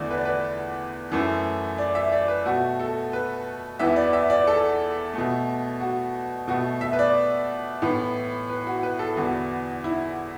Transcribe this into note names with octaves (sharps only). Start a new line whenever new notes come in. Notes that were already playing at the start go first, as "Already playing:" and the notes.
Already playing: E2 D3 A3 D5
B4
D5
B4
F#2 E3 A3
D5
E5
D5
B4
B2 A3 F#4
A4
B4
E2 E3 B3 E5
D5
E5
D5
A4
B2 A3
F#4
B2 A3 F#4
E5
B4
D5
A2 E3 B3
B4
F#4
B4
A4
E2 D3 B3 F#4
E4